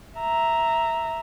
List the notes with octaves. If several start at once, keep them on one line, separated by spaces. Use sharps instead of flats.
E5 A#5